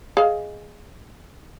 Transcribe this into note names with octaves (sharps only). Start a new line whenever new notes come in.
G#4 D#5 F5